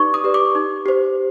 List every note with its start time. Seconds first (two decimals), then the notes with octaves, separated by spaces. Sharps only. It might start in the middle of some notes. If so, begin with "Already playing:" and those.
Already playing: D#4 G4 B4 D5 C#6 D6
0.14 D#6
0.24 G4 B4 D5
0.34 D6
0.55 D#4
0.86 G4 C5